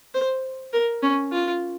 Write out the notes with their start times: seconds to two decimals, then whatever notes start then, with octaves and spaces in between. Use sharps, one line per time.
0.15 C5
0.73 A#4
1.03 C#4
1.32 F4